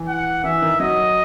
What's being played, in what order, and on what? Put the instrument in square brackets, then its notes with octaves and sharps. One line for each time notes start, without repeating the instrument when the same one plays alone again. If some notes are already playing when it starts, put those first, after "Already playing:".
Already playing: [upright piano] E3
[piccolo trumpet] F#5
[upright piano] E3 [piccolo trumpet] E5
[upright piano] D#3
[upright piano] F#3 [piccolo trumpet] D#5